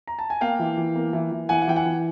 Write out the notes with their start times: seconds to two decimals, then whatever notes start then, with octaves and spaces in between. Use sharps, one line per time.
0.07 A#5
0.19 A5
0.30 G#5
0.41 A#3 F5 G5
0.59 E3
0.77 E3
0.96 A#3
1.13 E3
1.31 E3
1.49 E3 F#5 G#5
1.62 F#5
1.68 E3 G5
1.76 F#5 G#5
1.86 E3